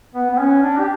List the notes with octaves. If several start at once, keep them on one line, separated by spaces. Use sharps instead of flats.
B3
B3
C#4
D4
G4